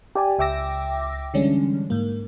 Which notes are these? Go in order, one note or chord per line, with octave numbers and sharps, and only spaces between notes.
G4 D5 G#5
C#2 E5 G5 D6 E6 A#6
D3 E3 G3 G#3 C#4 D4
G#2 A#3